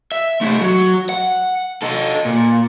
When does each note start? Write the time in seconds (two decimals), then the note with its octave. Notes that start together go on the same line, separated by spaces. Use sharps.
0.12 E5
0.41 A3 D#4
0.61 F#3
1.09 F#5
1.82 D#4 A4
2.25 A#2